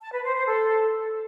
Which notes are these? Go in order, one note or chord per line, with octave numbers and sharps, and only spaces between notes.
A5
B4
C5
C5
A4